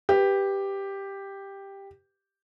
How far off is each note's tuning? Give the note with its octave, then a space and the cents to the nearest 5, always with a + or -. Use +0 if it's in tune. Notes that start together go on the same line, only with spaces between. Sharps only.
G4 +5 B4 +0